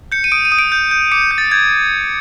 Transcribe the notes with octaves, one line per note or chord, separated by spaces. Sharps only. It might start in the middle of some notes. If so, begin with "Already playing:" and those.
G6 C#7
D#7
D#6 D7
D#7
D#6
D7
G6
G6
D6 C#7
G6
A6
G6 G#6